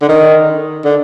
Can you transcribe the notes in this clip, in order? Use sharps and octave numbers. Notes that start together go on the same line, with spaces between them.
D3
D#3
D3